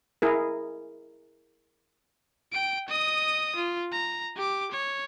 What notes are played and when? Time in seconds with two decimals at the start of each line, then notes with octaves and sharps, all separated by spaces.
0.22 E4 G#4 A#4
2.52 G5 D7
2.88 D#5 D#6
3.56 F4
3.92 A#5
4.36 G4 D6
4.72 C#5